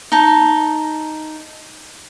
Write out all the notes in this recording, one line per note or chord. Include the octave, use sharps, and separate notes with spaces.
D#4 A5